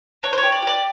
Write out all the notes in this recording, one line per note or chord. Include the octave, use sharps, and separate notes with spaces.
D4 C#5
C5
G4 C#5
D5
G4 D5